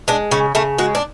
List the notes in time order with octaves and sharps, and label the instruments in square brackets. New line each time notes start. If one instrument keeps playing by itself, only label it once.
[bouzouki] G#3 D4
C#3 C#4
C#3 A3
G#3 F#4
D4